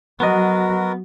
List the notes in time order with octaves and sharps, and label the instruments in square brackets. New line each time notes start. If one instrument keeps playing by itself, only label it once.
[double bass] F#3 [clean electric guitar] B3 D#5 [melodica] F#4 A#4